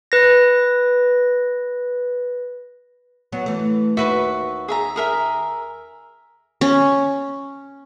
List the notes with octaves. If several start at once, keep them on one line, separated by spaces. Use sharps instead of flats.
B4 A#6
F#3 B3
E3 A3
D#2 F#4 B4 E5
G#4 E5 A#5
G#4 A#4 E5
C#4